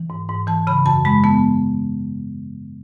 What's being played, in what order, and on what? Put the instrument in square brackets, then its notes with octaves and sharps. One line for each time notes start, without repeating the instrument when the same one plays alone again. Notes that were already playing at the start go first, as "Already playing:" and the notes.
Already playing: [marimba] E3
G#2
G#2
E3 A5
C#3 B5
F#2 A5
G#3 B5
B3 A5